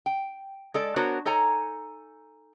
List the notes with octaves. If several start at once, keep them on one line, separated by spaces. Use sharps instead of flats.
G5
G#3 A4 D5
B3 D4 F#4 A#4 C5 C#5
D#4 A4 C#5 G#5 A#5